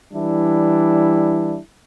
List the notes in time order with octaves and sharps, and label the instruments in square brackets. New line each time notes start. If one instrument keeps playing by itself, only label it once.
[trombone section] E3 G3 D4 E4